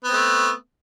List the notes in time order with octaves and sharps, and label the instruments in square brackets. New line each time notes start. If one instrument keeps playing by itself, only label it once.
[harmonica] B3
C4
A3